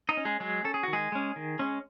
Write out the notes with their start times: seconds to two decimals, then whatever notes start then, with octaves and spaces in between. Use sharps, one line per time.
0.09 D#4 D#5
0.17 C#4
0.25 G#3 G#4
0.40 F#3 G#3 G#4
0.64 C#4 A4
0.74 G#4
0.83 D#3 F#4
0.93 G#3 G#4
1.12 G#3 C#4
1.36 D#3
1.59 G#3 C#4